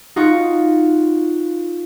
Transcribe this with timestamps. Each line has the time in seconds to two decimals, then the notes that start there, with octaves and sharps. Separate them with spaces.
0.16 D#4 F4 F#4